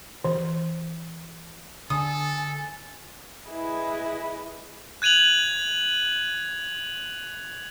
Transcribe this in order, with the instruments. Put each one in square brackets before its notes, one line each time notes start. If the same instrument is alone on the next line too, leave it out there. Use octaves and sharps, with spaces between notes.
[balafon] E3
[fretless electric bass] D3 [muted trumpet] A4 [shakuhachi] G#5 [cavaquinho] D#6
[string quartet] E4 G#4 B4 D#5
[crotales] F#6 G#6 D#7 F7 F#7